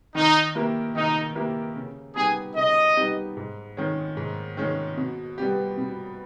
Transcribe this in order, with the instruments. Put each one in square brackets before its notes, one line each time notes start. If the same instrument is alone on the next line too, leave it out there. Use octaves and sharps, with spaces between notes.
[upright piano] D#3 [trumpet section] D#4
[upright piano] A#3 E4 G4 A#4
[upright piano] D#3 [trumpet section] D#4
[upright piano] A#3 E4 G4 A#4
C#3
[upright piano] G3 B3 D#4 G4 [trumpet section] G#4
[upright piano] C#3 [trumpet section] D#5
[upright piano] G3 B3 D#4 G4
G#2
D#3 G#3 C#4
G#2
D#3 G#3 C#4
B2
G3 B3 G4
B2